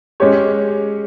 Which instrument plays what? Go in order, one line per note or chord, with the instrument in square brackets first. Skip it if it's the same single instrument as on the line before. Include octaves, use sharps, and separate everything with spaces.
[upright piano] G#3 C#4 G4 C#5